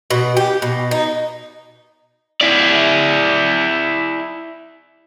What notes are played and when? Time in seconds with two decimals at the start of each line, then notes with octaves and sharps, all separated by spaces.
0.11 B2
0.37 G4
0.62 B2
0.91 D#4
2.41 E4 D5